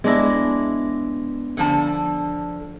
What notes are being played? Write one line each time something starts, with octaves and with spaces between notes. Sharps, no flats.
G#3 B3 D4 E4 A#6
D3 F3 A5